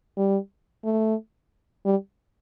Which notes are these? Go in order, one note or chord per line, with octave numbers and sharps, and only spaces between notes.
G3
A3
G3